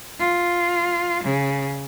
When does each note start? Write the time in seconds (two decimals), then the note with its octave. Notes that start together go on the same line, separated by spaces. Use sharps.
0.20 F4
1.24 C#3